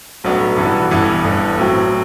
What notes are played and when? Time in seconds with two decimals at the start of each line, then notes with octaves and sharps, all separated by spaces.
0.24 B1 A2 F#3 B3 D4
0.57 G2 E3 B3 F#4 A4
0.91 G1 G2 E3 B3
1.24 G1 G2 E3
1.58 A2 F#3 C4